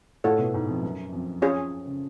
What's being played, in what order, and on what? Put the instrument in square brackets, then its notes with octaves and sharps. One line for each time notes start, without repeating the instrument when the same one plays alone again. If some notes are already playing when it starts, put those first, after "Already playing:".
[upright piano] A2 [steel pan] A3 F4 A4 C#5 F#5
[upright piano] B2
G#2
F2
F#2
F2
[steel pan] C#4 F4 G#4 C#5
[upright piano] C#3